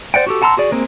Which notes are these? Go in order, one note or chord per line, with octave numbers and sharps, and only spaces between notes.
C5 D5 F#5 G5
F#4 G4 A4
F#5 A5 A#5 C6 E6
F#4 G#4 D5
G#3 A#3 C4 G#4